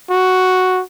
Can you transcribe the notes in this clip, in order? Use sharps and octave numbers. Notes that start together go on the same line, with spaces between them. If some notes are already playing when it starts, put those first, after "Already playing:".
F#4